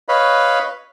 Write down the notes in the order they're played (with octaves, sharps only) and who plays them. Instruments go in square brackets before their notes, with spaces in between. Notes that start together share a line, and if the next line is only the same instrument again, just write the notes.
[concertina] B4 C#5 D#5 F5 B5